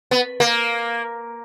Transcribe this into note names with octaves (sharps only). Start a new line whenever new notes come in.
B3
A#3